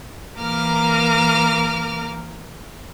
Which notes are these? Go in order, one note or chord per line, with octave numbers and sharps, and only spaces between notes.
E3 A#3 A#4 D6 F6